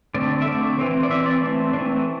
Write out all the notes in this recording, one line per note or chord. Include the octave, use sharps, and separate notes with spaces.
D3 A3 C4 D5
E5
D3 A3 C4 D5
E3 C4
D5
E3 C4 E5
D5
E3 A3 C4
E3 A3 C4 D4